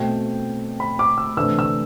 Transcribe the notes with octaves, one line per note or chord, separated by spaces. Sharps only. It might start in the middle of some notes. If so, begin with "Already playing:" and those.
Already playing: B2 A3 C4 G5
B5
D6
E6
C3 E3 A3 D4 E6
E6